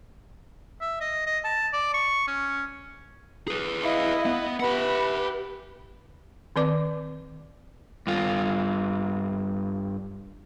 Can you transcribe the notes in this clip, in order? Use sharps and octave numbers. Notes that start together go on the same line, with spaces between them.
E5
D#5
D#5
A5
D5
C#6
C#4
G#4 B4
E4 D#5 F5
B3
G4 B4 E5 F#5 B5
D#3 C4 B4 D5 D6
G2 F4